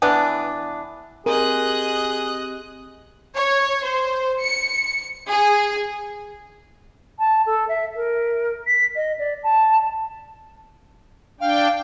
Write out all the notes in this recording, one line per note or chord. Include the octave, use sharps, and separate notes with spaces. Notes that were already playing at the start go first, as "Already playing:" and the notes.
E3 B3 D4
C4 G4 G#4 A#4 D#5 F#6
C#5
C5
C#7
G#4
A5
A4
E5
A#4
B6
D#5
D5
A5
D4 F5 G5